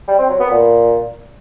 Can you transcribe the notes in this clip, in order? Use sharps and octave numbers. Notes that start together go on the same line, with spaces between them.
G3
C4
F#3
B3
A#2